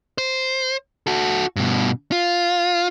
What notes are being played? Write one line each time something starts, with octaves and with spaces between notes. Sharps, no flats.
C5
F#4 A4
G2 B2
F4